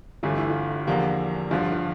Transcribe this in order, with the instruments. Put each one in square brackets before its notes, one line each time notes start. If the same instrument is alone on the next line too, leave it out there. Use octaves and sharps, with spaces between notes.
[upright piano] G1 G2 E3 A3 [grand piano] F4
[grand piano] E4
F4
[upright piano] E2 D3 F3 A#3 [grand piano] G4
[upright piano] G1 G2 D3 F3 [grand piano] F4
[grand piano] F4